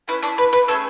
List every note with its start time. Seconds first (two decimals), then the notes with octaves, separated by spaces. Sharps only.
0.08 A3 C#4 E4 B4
0.23 D4 D5
0.38 B4
0.53 B4
0.68 A3 C#4 G#4 A4